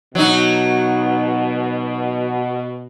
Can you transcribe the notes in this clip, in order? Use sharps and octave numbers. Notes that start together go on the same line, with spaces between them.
B2 F#3 D#4